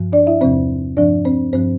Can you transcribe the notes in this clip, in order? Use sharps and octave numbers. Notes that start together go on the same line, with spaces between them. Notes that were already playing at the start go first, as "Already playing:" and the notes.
Already playing: G2 F3
D4 D5
E4 E5
E2 C3 F3 C4 C5
G2 F3 D4 D5
C4 C5
G2 F3 C4 C5